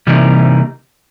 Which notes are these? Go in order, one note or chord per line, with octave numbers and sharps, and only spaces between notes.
C3 E3 G3 A#3 D#4